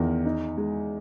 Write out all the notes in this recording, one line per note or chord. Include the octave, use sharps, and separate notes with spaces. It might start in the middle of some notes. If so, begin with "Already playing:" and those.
Already playing: E2 D#3
D#4
G#3